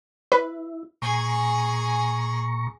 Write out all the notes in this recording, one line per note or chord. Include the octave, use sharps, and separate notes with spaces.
E4 B4
A#2 G#4 G#5 A#5 C#6